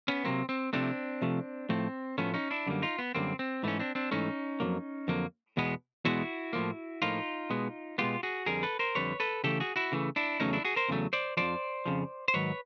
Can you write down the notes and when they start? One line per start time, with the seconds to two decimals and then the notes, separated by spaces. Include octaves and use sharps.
0.08 B3 C#4
0.25 C3 D#3 F#3 A#3 C4
0.49 C4
0.73 C3 F3 A3 C4 D4
1.22 C3 F3 A3
1.69 A2 F3 A3 C4
2.18 A2 F3 A3 B3 C#4
2.34 C#4 D#4
2.51 D4 E4
2.67 F#2 D3 G3 A#3
2.82 D#4 F4
2.99 B3
3.15 F#2 D3 G3 A#3 C4
3.39 C4
3.63 G#2 E3 A3 C#4
3.79 C4 D4
3.95 C4 D4
4.11 G#2 E3 A3 C#4 D#4
4.60 F2 D3 F#3 A#3
5.08 F2 D3 F#3 A#3
5.57 E2 B2 G#3 B3
6.05 E2 B2 G#3 B3 E4 F#4
6.53 A2 F3 A#3
7.02 A2 F3 A#3 D#4 F4
7.50 B2 G#3 B3
7.98 B2 G#3 B3 F4 G4
8.23 F#4 G#4
8.46 F2 D3 G3 G#4 A#4
8.63 A4 B4
8.79 A#4 C5
8.95 F2 D3 G3 B4 C#5
9.20 A4 B4
9.44 C#3 E3 A3 G4 A4
9.60 F#4 G#4
9.76 E4 F#4
9.92 C#3 E3 A3
10.16 D4 E4
10.40 E2 C#3 F#3 A3 C#4 D#4
10.53 D4 E4
10.65 F#4 G#4
10.76 A#4 C5
10.89 E2 C#3 F#3 A3
11.13 C5 D5
11.37 F2 C#3 F3 C5 D5
11.86 F2 C#3 F3
12.28 C5
12.34 G#2 D#3 F#3 B4 C#5